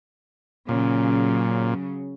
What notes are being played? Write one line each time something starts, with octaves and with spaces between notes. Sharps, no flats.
A#2 C#3 F#3